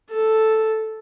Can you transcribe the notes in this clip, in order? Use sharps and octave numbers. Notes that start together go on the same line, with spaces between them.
A4